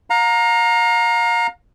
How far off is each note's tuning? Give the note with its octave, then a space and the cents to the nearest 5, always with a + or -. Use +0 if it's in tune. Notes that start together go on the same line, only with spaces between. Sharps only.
F5 +40 A#5 +0